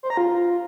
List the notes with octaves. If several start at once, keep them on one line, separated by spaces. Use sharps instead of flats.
C5
A#5
F4